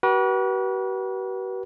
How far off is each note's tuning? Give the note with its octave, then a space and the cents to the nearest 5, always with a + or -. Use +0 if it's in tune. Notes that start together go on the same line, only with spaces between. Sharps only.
F#4 +45 B4 -35